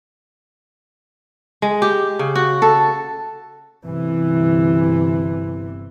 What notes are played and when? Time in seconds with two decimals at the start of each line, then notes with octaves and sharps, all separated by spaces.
1.62 G#3
1.82 G4
2.19 C#3
2.35 F#4
2.62 A4
3.84 G1 C3 E3